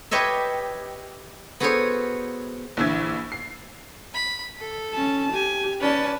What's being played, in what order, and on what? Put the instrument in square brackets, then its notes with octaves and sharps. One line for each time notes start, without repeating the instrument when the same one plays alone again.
[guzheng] G4 B4 C#5 D#5 E5
B3 F#4 G#4 A4 C5 C#5
[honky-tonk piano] A#1 D3 E3 E4 G#6
C7
[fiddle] B5
A4
[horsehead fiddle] C#4 A5
[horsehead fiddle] G4 [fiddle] G#5
[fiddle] C#4 A5 [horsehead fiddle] B4 D5